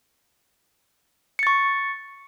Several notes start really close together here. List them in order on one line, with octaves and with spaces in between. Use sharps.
C#7 A6 C#6